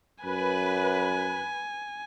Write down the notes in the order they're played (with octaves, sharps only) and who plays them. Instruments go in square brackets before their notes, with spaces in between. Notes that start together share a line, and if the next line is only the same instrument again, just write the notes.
[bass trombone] F#2 [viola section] B4 [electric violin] G#5